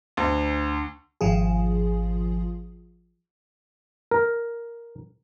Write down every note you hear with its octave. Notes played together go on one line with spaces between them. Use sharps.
D2
G#1 F3 F4 G#4
A#4